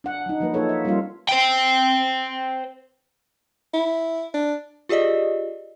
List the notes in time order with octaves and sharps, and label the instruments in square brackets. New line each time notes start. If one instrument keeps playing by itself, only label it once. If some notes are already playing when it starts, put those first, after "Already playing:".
[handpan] D4 F#5
F#3 D#4
F3 F#3 A#3 B4
A#3 D#4 F4 A4 C#5
E5
G3 A#3 C#4 D#4 F4 F5
[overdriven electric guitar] C5 G5
[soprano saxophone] E4
D4
[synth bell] F4 G4 G#4 D5 D#5